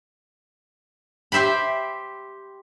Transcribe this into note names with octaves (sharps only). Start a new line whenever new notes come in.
G4 C5 E5 G5 B5